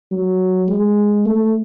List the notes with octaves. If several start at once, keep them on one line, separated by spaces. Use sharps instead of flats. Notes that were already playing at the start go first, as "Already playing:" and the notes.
F#3
G#3
A3